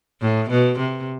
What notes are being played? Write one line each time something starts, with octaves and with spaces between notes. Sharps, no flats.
A2
B2
C3